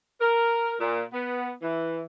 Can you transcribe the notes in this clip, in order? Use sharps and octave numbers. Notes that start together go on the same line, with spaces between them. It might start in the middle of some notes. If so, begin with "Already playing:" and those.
A#4
A#2
B3
E3